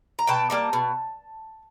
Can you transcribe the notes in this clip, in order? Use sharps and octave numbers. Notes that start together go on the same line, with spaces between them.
A#5
B2 G5 A5
G3 A#3 A5
B2